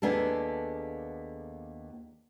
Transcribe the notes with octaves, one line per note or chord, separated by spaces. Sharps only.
D#2 A#3 B3 D4 G#4 A4